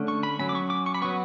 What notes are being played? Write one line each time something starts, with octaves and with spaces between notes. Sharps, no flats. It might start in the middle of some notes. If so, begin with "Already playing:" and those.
Already playing: D3 A3 C#4
C#6
B5
F#3 C#4 B5
D6
C#6
D6
C#6
B5
F#3 B3 C#6